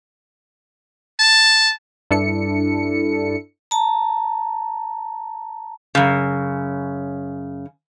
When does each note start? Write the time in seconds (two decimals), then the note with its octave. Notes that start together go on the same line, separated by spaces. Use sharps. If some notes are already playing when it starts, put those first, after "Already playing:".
1.20 A5
2.11 G2 D4 E4 A4 C#7
3.71 A5 A#5
5.95 F#2 C#3